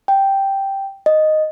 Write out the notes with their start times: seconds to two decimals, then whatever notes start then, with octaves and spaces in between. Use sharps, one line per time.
0.08 G5
1.06 D#5